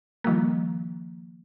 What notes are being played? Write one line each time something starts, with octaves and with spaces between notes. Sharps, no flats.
D#3 F3 G3 A#3